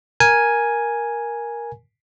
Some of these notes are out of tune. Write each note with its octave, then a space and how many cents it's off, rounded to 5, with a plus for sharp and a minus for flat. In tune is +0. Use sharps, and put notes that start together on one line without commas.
A#4 +10 G#5 +0